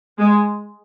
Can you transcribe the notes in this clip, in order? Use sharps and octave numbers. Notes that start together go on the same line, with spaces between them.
G#3